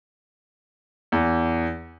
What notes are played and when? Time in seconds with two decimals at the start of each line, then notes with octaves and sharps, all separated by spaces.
1.12 E2